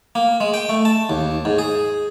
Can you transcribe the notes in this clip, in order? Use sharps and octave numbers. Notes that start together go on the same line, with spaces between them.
A#3
G#3
G5
A3
A5
D#2
G#2
G#4